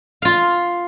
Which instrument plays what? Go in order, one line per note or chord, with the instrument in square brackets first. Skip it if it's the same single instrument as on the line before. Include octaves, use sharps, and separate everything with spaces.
[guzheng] F4 F5